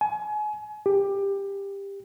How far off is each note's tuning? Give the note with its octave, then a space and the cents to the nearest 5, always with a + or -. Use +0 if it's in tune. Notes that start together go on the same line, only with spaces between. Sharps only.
G#5 +30
G4 +20